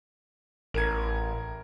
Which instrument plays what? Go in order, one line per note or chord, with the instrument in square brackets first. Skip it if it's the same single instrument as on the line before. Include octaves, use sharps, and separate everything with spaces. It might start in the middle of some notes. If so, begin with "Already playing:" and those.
[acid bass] A1 [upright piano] A#4 G#6